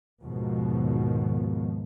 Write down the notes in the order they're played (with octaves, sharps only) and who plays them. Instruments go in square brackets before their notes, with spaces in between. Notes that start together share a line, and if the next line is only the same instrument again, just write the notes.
[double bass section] D#2 G#2 B2 D#3 F3